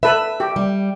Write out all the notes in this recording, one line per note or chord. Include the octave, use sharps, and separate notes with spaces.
A4 B4 E5
G4
G3